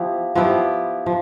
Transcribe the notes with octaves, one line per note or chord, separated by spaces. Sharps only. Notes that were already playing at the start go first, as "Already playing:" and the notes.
Already playing: F3 B3 E4 G4
F3 B3 E4 G4
F3